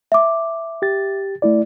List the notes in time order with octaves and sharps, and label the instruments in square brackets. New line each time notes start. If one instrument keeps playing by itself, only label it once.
[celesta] E5 D6
[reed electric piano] G4 A6
A3 E4 D5